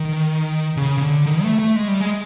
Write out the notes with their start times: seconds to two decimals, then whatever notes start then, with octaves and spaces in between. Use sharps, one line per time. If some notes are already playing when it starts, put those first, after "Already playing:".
Already playing: D#3
0.77 C#3
0.98 C#3
1.02 D3
1.26 D#3
1.43 A3
1.59 A3
1.76 G#3
1.88 G3
2.01 G#3